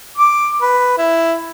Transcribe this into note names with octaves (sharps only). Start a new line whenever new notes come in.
D6
B4
E4